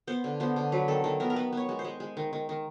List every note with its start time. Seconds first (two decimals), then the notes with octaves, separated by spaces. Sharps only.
0.07 B3 C5
0.24 D3
0.40 B3 C5
0.56 D3
0.72 F#3 B4
0.88 D#3 A4
1.04 D#3 A4
1.20 B3 A#4
1.30 A#4
1.36 B3 B4
1.53 B3 C#5
1.69 G#3
1.79 C5
1.84 G#3
2.00 G#3
2.17 D#3
2.33 D#3
2.49 D#3